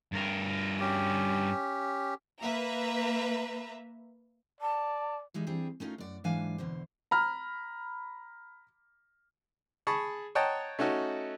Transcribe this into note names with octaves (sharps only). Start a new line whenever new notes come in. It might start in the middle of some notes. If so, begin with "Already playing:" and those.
G2 A#4
C#4 G4
A#3 B4 E5 A#5
D5 A5
E3 G3 G#3 D#4
G3 C4 D4 G4 G#4
A3 C#4 D#4 F4 A#4
F#2 D5 F#5
G#2 E3 F#3 D4 F5 G#5
E2 B2 D3 C5
A#5 B5 F6
G#4 A5 B5 C#6 D#6
C#5 D#5 F#5 G5 A5 A#5
A3 C#4 D#4 F#4 A4